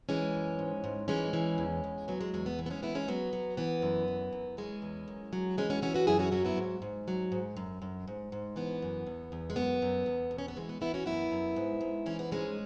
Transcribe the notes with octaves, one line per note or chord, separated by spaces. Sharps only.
E3 G#3 C#4
F#2
G#2
G#2
E3 G#3 C#4
E3
E2
E2
F#3 B3
G#3
E2 G#3
B3
E3
B3
G#3 C#4
E3 B3 E4
G#3 C#4
F#3 B3
F#3
E3 B3
F#2
E3
F#2
E3 G#3 C#4
E2
F#2
F#3
E3 G#3 C#4
C#4 F#4
E3 C#4 F#4
F#4 B4
F#2 E4 G#4
C#4 F#4
F#3 C#4 F#4
B3 E4
G#2
G#2
F#3
G#2
F#2
F#2
G#2
G#2
E3 B3
F#2
E2
E2
G#3
F#2 B3
F#2
E2
B2
C#4
B3
E3 G#3
B3
E3 B3 E4
C#4 F#4
F#2 B3 E4
F#2
G#2
G#2
E3 C#4
B3
G#2 G#3 C#4